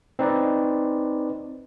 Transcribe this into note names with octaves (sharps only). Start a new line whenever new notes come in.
C4 D#4 B4 D5